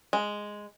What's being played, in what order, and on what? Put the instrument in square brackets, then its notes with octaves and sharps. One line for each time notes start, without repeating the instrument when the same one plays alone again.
[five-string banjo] G#3